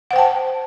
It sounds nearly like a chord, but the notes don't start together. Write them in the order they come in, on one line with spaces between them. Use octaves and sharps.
F#5 C5 G5 A5